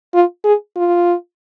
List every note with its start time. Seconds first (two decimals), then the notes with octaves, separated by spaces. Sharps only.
0.14 F4
0.44 G#4
0.76 F4